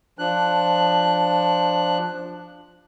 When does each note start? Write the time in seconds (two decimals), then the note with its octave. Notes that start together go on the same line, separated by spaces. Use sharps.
0.19 F3 D4 F#6